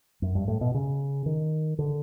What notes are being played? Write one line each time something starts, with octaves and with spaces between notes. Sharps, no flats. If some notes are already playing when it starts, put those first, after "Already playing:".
F#2
G2
A2
B2
C#3
D#3
D3